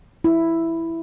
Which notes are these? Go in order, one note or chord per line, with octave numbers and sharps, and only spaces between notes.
E4